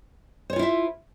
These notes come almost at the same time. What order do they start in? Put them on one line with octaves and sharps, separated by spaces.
C5 C#5 F4 E4 E5